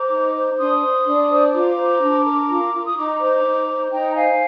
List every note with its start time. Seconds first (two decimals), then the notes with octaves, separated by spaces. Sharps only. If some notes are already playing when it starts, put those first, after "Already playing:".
Already playing: C5 A#5 D6
0.10 D#4
0.34 C5
0.57 D4 C6 D#6
0.82 C5
1.05 D4
1.29 C5
1.53 F4 A#5 D6
1.76 C5
2.01 D4
2.25 A#4
2.49 F4
2.73 F4
2.86 D#6
2.96 D#4 A#5 D6
3.20 C5
3.44 D#4
3.68 C5
3.91 D#4 G5 A#5
4.15 C5 F5 G#5